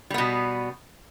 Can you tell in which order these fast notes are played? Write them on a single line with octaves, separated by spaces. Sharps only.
G3 B3 B2